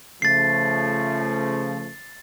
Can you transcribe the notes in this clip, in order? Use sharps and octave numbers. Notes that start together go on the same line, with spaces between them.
C#3 F3 A3 A6 C7